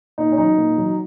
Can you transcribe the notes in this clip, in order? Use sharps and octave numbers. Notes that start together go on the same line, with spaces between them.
A#2 D#4
C#4
F#3 D#4
A#2
F#3